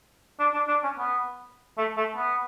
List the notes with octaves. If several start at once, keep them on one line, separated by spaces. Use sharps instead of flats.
D4
D4
D4
C#4
B3
A3
A3
B3